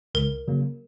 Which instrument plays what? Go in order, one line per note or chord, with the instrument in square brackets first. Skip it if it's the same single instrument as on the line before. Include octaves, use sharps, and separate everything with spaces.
[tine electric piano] C#2 [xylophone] A#4
[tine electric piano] C#3 F#3 A#3